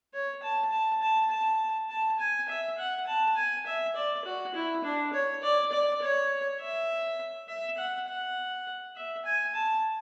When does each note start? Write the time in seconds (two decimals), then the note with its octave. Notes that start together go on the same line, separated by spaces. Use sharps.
0.14 C#5
0.43 A5
0.72 A5
1.02 A5
1.30 A5
1.90 A5
2.19 G#5
2.49 E5
2.78 F#5
3.07 A5
3.37 G#5
3.66 E5
3.96 D5
4.25 F#4
4.55 E4
4.84 D4
5.14 C#5
5.43 D5
5.72 D5
6.02 C#5
6.60 E5
7.48 E5
7.78 F#5
8.08 F#5
8.96 E5
9.25 G#5
9.55 A5